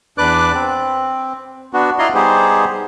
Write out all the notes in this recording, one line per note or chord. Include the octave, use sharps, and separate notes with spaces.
E2 D4 B4 D5 D6 F#6
C4
B3 D4 F#4
E4 F4 D5 D#5 A#5 C6
G3 B3 D#4 G4 G#4 C5